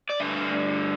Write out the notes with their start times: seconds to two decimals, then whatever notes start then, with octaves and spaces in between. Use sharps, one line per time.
0.09 D5
0.20 G2 D3 A3 E5